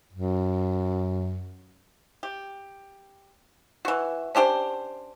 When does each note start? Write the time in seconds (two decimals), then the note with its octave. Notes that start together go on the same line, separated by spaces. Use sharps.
0.13 F#2
2.23 G4
3.85 E3 F#4
4.35 C#4 D4 G4 C5